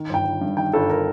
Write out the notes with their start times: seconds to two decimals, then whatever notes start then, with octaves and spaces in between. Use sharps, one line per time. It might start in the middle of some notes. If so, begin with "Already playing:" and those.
Already playing: D#3
0.09 G1 G5
0.25 G1
0.41 G2
0.57 D#3 G5
0.73 G1 A4
0.90 A#4